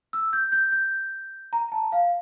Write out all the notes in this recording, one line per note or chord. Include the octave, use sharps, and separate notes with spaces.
E6
G6
G6
G6
A#5
A5
F5